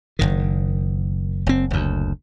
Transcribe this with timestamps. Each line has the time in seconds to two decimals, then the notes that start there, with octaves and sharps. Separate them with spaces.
0.19 F#1 C2 D#3
1.46 F#1 C4
1.71 F#1 D2